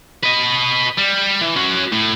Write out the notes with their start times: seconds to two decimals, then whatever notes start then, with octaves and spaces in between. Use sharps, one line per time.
0.23 B4 D#5
0.98 G3
1.42 E3
1.57 C#4 F#4
1.92 A2